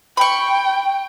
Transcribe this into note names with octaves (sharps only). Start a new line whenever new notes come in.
G5 B5 C#6